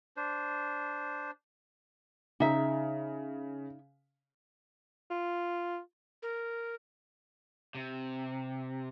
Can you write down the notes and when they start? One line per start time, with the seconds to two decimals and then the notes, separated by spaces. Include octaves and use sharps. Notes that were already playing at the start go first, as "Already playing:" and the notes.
0.17 D4 C5
2.40 C#3 D#4 E5
5.10 F4
6.22 A#4
7.75 C3